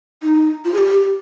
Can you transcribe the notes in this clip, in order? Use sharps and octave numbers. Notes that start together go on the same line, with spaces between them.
D#4
F4
G#4
G4